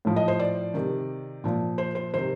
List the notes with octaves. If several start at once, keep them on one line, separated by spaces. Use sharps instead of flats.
A2 F3
D#5
C5
D5
C3 D#3
A#2 F3
C5
C5
C3 D#3 C5